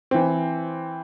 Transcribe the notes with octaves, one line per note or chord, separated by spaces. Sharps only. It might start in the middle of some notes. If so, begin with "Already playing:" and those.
E3 C4